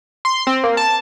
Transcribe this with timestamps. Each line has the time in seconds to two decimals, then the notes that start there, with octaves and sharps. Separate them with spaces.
0.25 C6
0.47 C4
0.64 A#3
0.77 A5